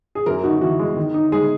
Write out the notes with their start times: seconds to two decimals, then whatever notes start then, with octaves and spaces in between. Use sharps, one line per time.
0.15 G#4
0.26 F#2 A#4
0.44 D#4 F#4
0.61 E3 F#4
0.79 G#3
0.96 D#3
1.14 D#4
1.32 G#3 G#4